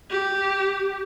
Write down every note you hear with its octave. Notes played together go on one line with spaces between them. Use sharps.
G4